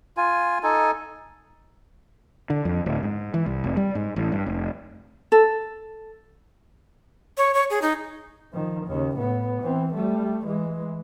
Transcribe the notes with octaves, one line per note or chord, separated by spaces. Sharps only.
F4 G#5
D#4 A4 G#5
D3
F2
D1
G#2
E3
C2
F1
G3
G#2
A1
G2
F1
A4
C#5
C#5
G#4
D#4
D#3 F3
D#2 C#3
A2 B3
E3 C4
G3 A3
E3 G#3